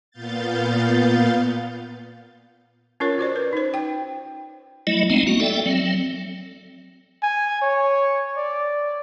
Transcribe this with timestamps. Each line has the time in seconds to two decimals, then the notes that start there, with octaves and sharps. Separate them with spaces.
0.11 A#2 B3 F5 G6 A6
3.00 C#4 F4 A#4 C#5
3.18 C#4 F#4 C5 D5
3.36 B4
3.53 D#4 C5
3.74 G5
4.87 F#3 A3 E4 D#5
5.10 G#3 A3 B3 C4 D#4
5.27 A#3 F#4
5.40 A4 D5 E5 G5
5.66 F#3 C4
7.23 G#5
7.62 C#5
8.37 D5